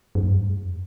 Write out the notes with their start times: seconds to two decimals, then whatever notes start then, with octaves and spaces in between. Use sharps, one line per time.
0.15 F#2
0.27 G2
0.44 F2